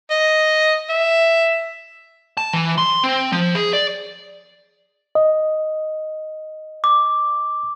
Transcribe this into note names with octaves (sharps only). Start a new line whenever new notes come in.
D#5
E5
A5
E3
C6
C4
F3
G#4
D5
D#5
D6